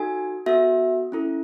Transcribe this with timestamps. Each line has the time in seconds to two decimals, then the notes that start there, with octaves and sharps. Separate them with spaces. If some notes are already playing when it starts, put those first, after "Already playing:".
Already playing: D#4 F#4 A4 G#5
0.46 B3 F#4 A4 E5
1.12 C#4 E4 A4